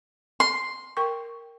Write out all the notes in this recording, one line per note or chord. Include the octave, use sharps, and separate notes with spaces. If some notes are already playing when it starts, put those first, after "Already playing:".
C6
A#4 G5 C#6